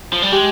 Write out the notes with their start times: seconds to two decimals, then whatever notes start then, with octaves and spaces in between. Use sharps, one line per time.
0.13 F3
0.23 G3
0.32 G#3 G4